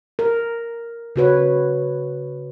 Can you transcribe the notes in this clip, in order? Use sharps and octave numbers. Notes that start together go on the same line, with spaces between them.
A#4
C#3 F#4 B4 C#5